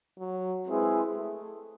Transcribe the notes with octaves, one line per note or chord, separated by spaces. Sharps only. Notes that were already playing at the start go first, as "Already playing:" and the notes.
F#3
G#3 C4 E4 G#4 B4
A3